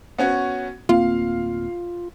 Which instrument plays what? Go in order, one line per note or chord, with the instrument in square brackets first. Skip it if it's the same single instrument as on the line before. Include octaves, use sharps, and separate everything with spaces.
[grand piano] B3 C#4 F#4
[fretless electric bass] D1 A#3 C4 [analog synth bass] F4 [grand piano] F5